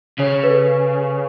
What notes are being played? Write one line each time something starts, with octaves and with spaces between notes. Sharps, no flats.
C#3 C#5
B4
A4